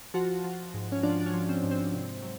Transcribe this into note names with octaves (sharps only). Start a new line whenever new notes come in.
F3 F#4
F3
G#2
C#4
F3 D4
D4
C#4
F3
C4
G#2
C4
C3
F#3